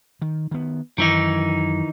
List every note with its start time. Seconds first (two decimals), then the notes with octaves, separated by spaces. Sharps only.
0.22 D#3
0.51 D#3 B3
0.98 F#2 D#3 E3 D#4